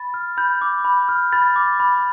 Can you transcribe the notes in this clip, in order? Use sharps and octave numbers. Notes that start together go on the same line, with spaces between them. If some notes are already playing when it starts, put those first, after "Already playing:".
Already playing: B5 A6
F6
B5 G6
D6
B5
F6
B5 A6
D6
B5